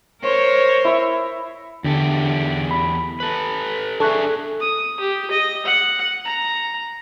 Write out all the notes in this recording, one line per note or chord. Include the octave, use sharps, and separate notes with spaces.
A#4 C5 C#5
E4 E5
E2 D3 G4 A4
B5
A4 B4
D4 G#4 A4 E5 C#6 F#6
D#6
G4
D#5
F#5
A#5